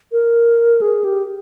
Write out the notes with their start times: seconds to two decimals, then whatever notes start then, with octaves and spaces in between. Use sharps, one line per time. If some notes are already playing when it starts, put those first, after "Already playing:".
0.12 A#4
0.81 G#4
1.04 G4